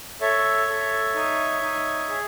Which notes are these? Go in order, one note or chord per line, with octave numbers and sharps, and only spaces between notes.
A4 C#5 E5
A4
D#4
D#4
G#4